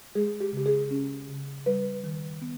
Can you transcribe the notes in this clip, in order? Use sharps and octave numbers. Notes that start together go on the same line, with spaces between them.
G#3 G#4
G4
C#3 G4
G#4
C#4
C#3
G3 B4
D#3
B3